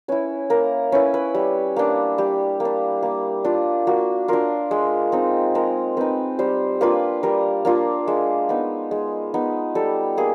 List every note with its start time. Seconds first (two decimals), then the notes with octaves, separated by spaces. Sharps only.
0.08 C#4 E4 B4
0.50 A#3 A#4
0.92 C#4 E4 B4
1.14 B4
1.35 G3
1.76 A#3 D4
2.18 G3 G4
2.60 A#3
2.65 D4
3.02 A#3
3.44 D4 F4
3.87 A#3 F#4
4.28 D4 F4 A#4
4.71 G#3
5.12 C4 D#4
5.55 G#3 A#4
5.97 C4 D#4 B4
6.39 G3 C5
6.81 A#3 D4 F4 B4
7.23 G3 A#4
7.65 A#3 D4 F4
8.08 G#3
8.49 B3 D#4
8.91 G#3
9.34 B3 D#4
9.75 G3 A4
10.17 A#3 G#4